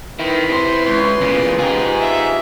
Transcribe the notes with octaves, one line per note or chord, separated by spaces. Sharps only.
D#3 E4 B4 C6
C3 C5
C#2
E2 A#2 C#3
D#4 F4 G4 G#4
E5